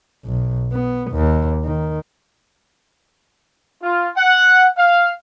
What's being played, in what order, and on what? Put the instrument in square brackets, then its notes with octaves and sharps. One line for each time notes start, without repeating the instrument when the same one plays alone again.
[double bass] B1
B3
D#2
D#3
[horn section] F4
F#5
F5